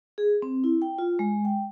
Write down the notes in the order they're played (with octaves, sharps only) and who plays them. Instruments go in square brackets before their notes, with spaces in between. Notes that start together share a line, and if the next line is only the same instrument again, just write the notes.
[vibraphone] G#4
C4
E4
G5
F4
G#3
G5